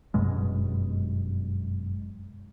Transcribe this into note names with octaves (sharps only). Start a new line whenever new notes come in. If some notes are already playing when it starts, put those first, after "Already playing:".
G1 F#2 B2 G#3